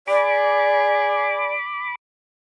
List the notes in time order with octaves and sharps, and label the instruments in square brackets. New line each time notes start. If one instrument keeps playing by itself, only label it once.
[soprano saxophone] G#4 [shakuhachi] D5 [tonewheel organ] B5 D6